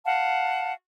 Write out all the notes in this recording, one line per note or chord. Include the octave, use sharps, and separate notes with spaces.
F5 F#5 A5